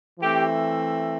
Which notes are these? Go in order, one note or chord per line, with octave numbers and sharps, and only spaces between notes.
E3 A3 C4 G4